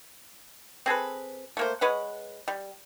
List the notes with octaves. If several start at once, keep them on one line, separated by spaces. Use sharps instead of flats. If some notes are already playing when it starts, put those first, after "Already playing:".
C4 G#4 A4 B4
A3 A#3 C5
G#3 B4 C#5 F#5
G3